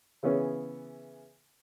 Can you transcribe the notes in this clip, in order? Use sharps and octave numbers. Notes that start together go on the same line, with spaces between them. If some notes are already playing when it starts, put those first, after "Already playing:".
C#3 E3 B3 C#4 G#4